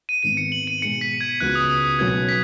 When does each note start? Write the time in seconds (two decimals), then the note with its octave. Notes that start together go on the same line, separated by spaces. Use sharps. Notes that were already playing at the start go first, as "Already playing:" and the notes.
0.09 D#7
0.23 G#1 G#2 D#3 B3 D#7
0.37 C#7
0.52 F#7
0.67 D#7
0.81 B2 G#3 D#4 G#4 C#7
1.01 B6
1.21 G#6
1.40 C#2 C#3 B3 F#4 F#6
1.55 D#6
1.70 D#6
1.84 D#6
1.99 B1 B2 F#3 C#4 B4 G#6
2.29 B6